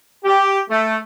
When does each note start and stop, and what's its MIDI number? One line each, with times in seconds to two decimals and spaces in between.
0.25 0.60 67
0.70 0.96 57